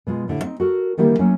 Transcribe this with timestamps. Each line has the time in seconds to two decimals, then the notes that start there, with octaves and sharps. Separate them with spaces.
0.07 B2 G#3 F4
0.28 A2 D3 E4 A4
0.44 C4 D#4
0.60 F#4 A4 A#4
0.97 D3 D#3 G3 A#3 E4 G4
1.19 F#3 A3 A#3 C#4 E4